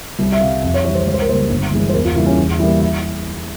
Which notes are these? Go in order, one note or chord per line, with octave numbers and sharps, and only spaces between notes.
C2
E5
C3 G3 F5
F2 E5
C#5
E5
E3 G3 C#5
C5
C#2 C#5
C5
A#4
C#3 G3 A#3 C5
G1
G2 E3 G#3
C5
E2 A#4
F4
C#3 E3 G3 A#3 E4
C#4
E2
E3 G3 A#3 E4
E4